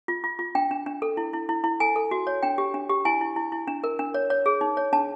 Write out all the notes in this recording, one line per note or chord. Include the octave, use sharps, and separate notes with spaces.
F4
F4
F4
D4 G5
D4
D4
A4
E4
E4
E4
E4
A4 G#5
A4
F#4
C#5
D4 G5
G4
D4
G4
E4 G#5
E4
E4
E4
D4
A#4
D4
C#5
C#5
G#4
D#4
C#5
D4 A5